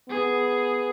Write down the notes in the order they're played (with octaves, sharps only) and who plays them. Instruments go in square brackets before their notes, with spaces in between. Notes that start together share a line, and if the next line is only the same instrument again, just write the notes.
[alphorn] B3 [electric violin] G#4